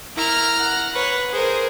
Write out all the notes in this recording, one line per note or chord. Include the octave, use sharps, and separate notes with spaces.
E4 A#4 A#5 F6
F#5
B4 C#5
G#4 A#4 C5